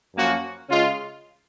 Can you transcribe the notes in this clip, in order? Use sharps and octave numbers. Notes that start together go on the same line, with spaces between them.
F#2 F3 A#3 C#4 F#4
C#3 G#3 C#4 F4